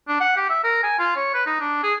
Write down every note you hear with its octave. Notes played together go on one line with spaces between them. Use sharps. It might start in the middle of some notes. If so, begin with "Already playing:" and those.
D4
F#5
G4
E5
A#4
G#5
F4
C#5
B4
D#4
D4
G#4